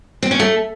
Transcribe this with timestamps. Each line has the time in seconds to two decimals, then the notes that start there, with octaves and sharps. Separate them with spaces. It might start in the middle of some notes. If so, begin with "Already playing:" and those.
0.22 C4
0.31 C#4
0.39 A3